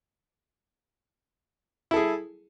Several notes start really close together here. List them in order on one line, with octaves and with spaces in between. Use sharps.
E4 A4 G#4